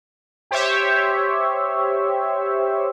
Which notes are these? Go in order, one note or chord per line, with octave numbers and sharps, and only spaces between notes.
G4 C5 C#5 E5